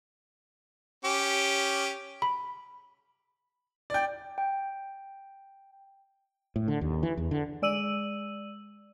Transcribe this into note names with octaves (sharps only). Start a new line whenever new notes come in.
C#4 G4
B5
D5 G5
G5
A2
D3
D#2
E3
E2
D3
G#3 D5 E6 D#7 F#7